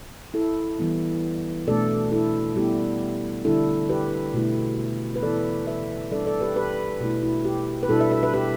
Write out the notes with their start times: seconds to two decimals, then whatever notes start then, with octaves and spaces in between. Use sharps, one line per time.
0.34 E4 A4
0.79 E3 G3 B3 E4
1.67 B2 A3 D4 A4 D5
2.12 E4 A4
2.56 G3 B3 E4 G4
3.45 D3 G3 D4 E4 A4
3.89 G4 B4
4.34 B2 A3 E4
5.16 B4
5.23 E3 B3 E4 A4 D5
5.67 B4 E5
6.11 G3 D4 A4 D5
6.27 A4 D5
6.41 G4 B4
6.56 G4 B4
7.00 B2 A3 E4
7.23 E4
7.45 G4
7.83 B4
7.89 B2 G3 D4 E4 A4
8.00 B4 E5
8.12 B4 E5
8.23 B4 E5
8.34 G4 B4